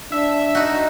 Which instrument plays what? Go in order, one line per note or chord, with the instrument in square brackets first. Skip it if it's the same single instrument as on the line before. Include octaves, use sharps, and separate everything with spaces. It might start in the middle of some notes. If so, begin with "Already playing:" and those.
[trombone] D4 [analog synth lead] E5
[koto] D#4 F#4